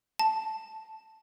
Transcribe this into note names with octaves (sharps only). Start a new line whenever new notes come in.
A5